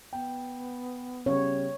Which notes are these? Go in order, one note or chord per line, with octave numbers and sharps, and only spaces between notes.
B3 G5
C#3 G3 C#5